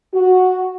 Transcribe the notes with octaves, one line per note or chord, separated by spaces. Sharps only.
F#4